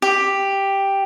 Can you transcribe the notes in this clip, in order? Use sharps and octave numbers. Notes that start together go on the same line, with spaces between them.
G4